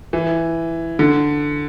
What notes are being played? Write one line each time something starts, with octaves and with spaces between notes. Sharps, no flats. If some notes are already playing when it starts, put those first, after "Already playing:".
E3
D3